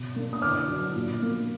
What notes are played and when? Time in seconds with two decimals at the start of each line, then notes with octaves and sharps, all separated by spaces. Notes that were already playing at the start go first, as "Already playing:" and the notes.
Already playing: B2
0.16 A#3 D4
0.33 D#6
0.42 D3 D6 F6
0.68 F#3 D4
0.95 A#2
1.22 F3 A#3